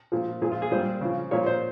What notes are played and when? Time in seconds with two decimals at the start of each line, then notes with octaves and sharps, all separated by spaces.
0.12 A#2 F3
0.42 A#2 F3 G#4
0.52 F4
0.62 G#4
0.71 A#2 G3 C5
1.01 C#3 F3
1.31 A#2 F3 C#5
1.46 C5